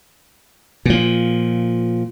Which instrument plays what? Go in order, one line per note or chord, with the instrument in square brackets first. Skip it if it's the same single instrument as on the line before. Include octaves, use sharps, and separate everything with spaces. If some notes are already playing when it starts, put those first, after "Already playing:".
[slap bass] A#2 F3